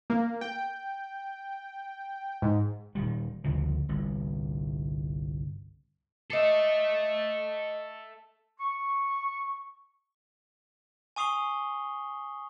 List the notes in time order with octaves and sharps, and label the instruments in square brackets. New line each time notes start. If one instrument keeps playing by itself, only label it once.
[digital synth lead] A#3
G5
G#2
[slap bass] D#1 D#3 G3
G1 D2 C#3 F3
G1 C2
[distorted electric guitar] A4 E5 [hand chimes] D#5 D6 C7
[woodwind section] C#6
[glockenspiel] G#5 C#6 D#6 C7 F7 G7